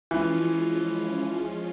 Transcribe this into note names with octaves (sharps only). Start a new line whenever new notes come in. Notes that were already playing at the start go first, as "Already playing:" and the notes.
E3 F3 G#3 C#4 F4